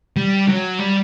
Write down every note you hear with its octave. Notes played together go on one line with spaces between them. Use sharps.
G3
F#3
G3